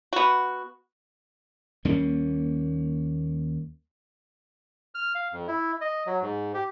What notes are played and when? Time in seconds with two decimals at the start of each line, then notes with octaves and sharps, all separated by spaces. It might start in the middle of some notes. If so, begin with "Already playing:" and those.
0.13 B3 F#4
1.85 D#2 G3 A#3 C#4
4.95 F6
5.15 F5
5.32 F2
5.48 E4
5.81 D#5
6.07 F#3
6.22 G#2
6.54 G4